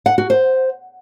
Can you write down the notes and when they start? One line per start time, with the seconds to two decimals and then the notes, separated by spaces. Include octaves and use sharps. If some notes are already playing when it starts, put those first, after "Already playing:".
0.06 F#5
0.18 F#4
0.30 C5